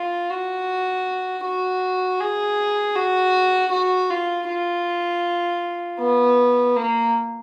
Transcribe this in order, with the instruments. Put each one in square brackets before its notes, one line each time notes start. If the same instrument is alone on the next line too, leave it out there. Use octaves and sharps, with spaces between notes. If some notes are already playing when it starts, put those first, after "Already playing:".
Already playing: [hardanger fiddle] F4
F#4
F#4
G#4
F#4
F#4
F4
F4
B3
A#3